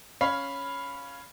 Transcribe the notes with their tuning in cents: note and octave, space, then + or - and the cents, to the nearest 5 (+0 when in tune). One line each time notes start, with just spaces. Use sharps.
C#4 +0 F5 +0 B5 +0